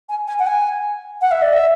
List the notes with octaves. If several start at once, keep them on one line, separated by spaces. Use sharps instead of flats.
G#5
G#5
F#5
G#5
F#5
E5
D5
E5